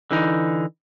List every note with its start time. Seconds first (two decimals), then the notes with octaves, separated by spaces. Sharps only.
0.11 D3 E3 D#4